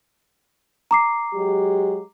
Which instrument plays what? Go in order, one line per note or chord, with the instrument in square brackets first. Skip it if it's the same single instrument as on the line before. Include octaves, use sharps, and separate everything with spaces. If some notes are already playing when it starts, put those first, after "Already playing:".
[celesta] A#5 D6 C7
[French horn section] F#3 G#3 G4